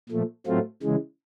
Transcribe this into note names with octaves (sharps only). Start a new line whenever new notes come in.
A#2 F3 A3
A2 F#3 A3 C4 F4
C#3 E3 G#3